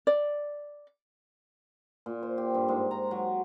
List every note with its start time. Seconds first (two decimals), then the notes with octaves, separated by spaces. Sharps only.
0.07 D5
2.06 A#2
2.23 C5
2.38 G4
2.54 G2
2.68 G#2
2.91 A#5
3.11 F#3